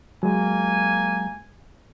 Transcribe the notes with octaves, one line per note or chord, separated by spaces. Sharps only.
F#3 G#3 A#3 G#5